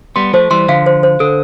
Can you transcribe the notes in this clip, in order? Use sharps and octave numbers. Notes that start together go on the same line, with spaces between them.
G3 B3 C6
F3 A3 C5
E3 G3 C6
D3 F3 F5
C5
C5
D3 A4